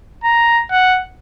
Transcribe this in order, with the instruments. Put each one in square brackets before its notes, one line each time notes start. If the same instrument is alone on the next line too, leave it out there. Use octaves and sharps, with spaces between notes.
[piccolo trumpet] A#5
F#5